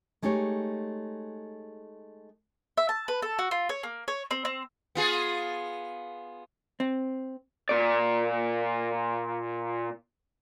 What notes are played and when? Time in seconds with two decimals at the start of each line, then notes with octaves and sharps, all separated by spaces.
0.22 G#3 A3 D#4 G4 C#5
2.77 E5
2.89 A5
3.08 B4
3.22 A4
3.39 F#4
3.51 F4
3.69 C#5
3.83 A#3
4.08 C#5
4.31 C4
4.45 C4
4.95 B3 F4 G#4
6.80 C4
7.69 A#2 D5